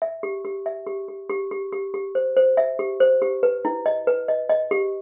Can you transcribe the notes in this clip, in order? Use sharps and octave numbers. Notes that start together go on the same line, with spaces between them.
E5
G4
G4
E5
G4
G4
G4
G4
G4
G4
C5
C5
E5
G4
C5
G4
B4
E4
D#5
B4
D#5
D#5
G4